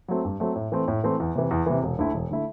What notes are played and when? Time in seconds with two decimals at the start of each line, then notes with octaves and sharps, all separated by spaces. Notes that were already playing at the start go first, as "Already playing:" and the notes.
0.08 F#3 A3 C4
0.25 G2
0.40 F#3 A3 C4
0.56 A2
0.72 E3 A3 C4
0.88 A2
1.04 E3 A3 C4
1.20 E2
1.36 C3 E3
1.51 E2
1.66 C3 E3
1.83 E1
1.99 D2 D3 A3 E4
2.14 E1
2.31 D3 A3 E4